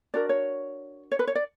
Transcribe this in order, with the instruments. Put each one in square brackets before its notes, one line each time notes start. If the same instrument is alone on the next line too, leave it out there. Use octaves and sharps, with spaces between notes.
[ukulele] D4 F#4 A#4 D5
C#5
C#5
B4
C#5
D5